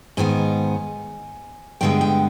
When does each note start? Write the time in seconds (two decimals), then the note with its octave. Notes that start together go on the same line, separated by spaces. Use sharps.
0.17 G#2 D#3 B3 G#5
1.81 G2 D3 G#3 B3 G5
2.01 G5